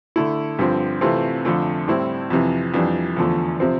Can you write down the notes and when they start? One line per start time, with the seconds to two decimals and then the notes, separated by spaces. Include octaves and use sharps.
0.16 D3 A3 E4
0.59 G2 D3 F3 C4
1.01 C3 E3 A3 C4 F4
1.45 F2 D3 F3 A3
1.88 A2 G3 C4 E4
2.30 F2 C3 E3
2.74 F2 E3 G3 D4
3.17 E2 D3 F3 A3
3.60 C3 F3 C4